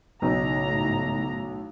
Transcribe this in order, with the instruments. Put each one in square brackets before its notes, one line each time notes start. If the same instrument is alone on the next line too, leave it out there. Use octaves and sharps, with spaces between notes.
[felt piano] B1 [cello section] A2 [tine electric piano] C#3 D#4 [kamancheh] A#5